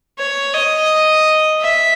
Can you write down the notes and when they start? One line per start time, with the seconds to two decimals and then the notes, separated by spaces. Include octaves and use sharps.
0.19 C#5
0.55 D#5
1.61 E5